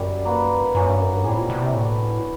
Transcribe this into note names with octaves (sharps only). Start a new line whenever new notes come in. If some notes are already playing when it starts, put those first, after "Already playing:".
Already playing: F#2 G3 F#4
A#3 D#4 F#4 B4
F#2 A#3 C#4 F#4
G2
F#2
G2
A2 G3 C4 E4 G#4
A#2
B2
C3
A2 B3 D4 F#4 B4